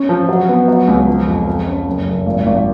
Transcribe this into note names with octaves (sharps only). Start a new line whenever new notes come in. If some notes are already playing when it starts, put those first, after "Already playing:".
Already playing: C#4
F3
F#3
B3
F#3
C#2
F3
F2
F2
C#4
F#1
F#1
G#1
G#1